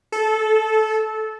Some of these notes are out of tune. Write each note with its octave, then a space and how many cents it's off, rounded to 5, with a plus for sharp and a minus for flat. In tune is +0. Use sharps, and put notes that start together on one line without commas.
A4 -15